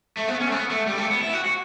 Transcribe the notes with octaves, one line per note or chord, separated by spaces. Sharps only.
A3
B3
C#4
A3
B3
A3
G3
A3
B3
E4
F#4
F#4